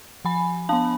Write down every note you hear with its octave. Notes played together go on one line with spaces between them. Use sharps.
F3 G#5 B5
B3 D4 F5 A5